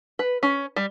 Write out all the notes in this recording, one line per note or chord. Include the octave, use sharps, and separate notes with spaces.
B4
C#4
G3